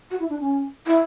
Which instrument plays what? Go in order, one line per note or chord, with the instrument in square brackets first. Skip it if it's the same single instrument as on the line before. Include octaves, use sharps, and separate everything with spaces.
[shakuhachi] F#4
E4
D4
C#4
E4